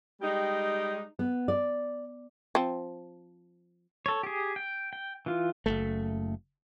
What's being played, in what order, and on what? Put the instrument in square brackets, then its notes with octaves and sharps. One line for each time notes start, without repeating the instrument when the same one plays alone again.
[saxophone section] G3 G#3 D#4 G4
[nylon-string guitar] B3
D5
[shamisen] F3 C4
[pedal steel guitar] A4 C#5
G4 G#4
G5
G5
E3 F4
[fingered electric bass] F#1 C#2 A3